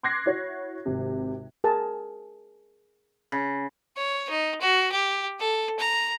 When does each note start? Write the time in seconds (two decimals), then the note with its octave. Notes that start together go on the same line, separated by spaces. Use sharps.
0.03 C6 D6 F#6 G#6 A#6 C7
0.26 E4 F#4 C#5
0.86 G#1 C3
1.64 G#4 A#4 A5
3.32 C#3
3.97 C#5
4.30 D#4
4.61 F#4
4.92 G4
5.39 A4
5.79 A#5